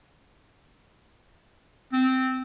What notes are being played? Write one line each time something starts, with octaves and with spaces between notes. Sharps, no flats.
C4